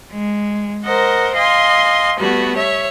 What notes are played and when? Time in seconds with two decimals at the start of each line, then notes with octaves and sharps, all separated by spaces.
0.12 G#3
0.84 A#4 C5 D#5 F#5
1.35 D#5 F5 G#5 C6
2.19 G3 A3 B3 F#4
2.57 C#5 E5